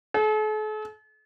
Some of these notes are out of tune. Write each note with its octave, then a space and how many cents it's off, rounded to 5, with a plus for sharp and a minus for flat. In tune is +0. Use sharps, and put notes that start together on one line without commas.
A4 -45